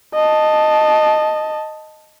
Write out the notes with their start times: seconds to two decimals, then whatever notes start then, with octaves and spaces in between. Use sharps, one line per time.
0.15 D#5 A5